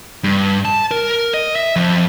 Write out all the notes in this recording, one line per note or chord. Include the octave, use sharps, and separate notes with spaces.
G2
A5
A#4
D#5
E5
F2